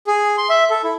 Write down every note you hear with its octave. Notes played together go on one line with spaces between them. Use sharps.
G#4
C6
E5
A4
E4